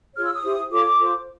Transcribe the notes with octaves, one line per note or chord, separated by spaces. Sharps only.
F4 G#4 C#5 F6
E6
D#6
E4 G4 C5
F4 A4 C#5 D6
F4 A4 C5